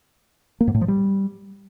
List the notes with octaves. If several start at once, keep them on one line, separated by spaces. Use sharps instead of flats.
A#3
G#2
A2
F3
G3